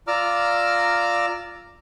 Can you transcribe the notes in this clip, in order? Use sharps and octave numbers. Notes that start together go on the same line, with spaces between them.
F4 D5 A#5 D6 E6 F6